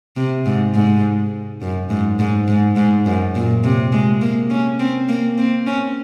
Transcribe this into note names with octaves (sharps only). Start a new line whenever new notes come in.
C3
G#2
G#2
F#2
G#2
G#2
G#2
G#2
F#2
A#2
C3
G#3
A#3
C#4
C4
A#3
C4
C#4